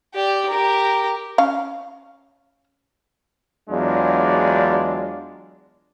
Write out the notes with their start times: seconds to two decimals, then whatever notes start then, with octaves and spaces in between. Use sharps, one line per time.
0.15 G4 D5
0.50 G4 A#4
1.38 C#4 F5
3.70 E2 F#3 G#3 D4 F4